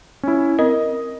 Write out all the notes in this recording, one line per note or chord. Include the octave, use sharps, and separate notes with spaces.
C#4 E4
C4 A#4 D#5